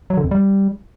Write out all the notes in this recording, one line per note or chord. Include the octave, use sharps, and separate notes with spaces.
F#3
D3
F2
G3